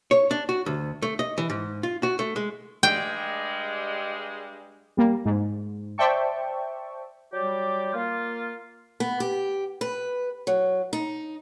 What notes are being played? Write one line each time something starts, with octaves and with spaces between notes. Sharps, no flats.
C#5
D4
F#4
D2
A3
D#5
E3
G#2
F4
F#4
A3
G#3
G2 G3 G#3 G5
G3 A#3
G#2
C5 D5 E5 G5 A5 C#6
F#3 G3 G4 D5
A#3 F4
B3
G4
B4
F#3
D#4